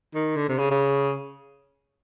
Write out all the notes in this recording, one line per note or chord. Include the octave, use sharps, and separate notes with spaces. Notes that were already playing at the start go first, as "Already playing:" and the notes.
D#3
D3
C3
C#3
C#3